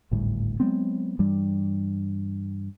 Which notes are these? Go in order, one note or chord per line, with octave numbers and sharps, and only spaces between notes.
G#1 D2 A2 G3
F#3 G#3 B3 C4
G2 E3 G3